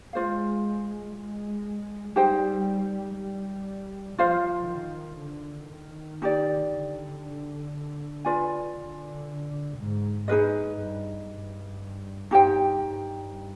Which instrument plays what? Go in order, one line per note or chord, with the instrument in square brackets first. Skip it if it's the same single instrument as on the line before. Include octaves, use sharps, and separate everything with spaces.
[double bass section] G#3 [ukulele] F4 C5 F5
[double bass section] G#3
[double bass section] G3 [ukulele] D#4 G4 C5 G5
[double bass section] G3
[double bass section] F3 [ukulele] F4 C5 F5
[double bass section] D#3
D3
D#3
[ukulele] D#4 G4 D5
[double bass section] D3
[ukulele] F4 B4 D5 G#5
[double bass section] D3
G#2
[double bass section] G#2 [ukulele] D#4 G#4 B4 D#5
[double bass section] G2
G2
[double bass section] G2 [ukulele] D#4 G4 C5 G5
[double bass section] G2